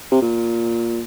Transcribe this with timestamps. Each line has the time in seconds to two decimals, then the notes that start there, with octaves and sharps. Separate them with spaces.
0.11 C3
0.22 A#2